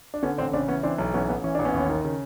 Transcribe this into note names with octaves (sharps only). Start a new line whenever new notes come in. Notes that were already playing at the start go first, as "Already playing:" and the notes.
D4
D3 B3 C#4
A1 C4 D4
C#3 C4 D4
E3 B3 C#4
E3 C4 D4
B1
E3 B3 C#4
A1 B3
E3 C#4
A1 D4
B3 C#4
D#2
D#3
C#3